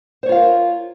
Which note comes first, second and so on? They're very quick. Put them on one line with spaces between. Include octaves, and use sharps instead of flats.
C5 C#5 F4 F5 A#4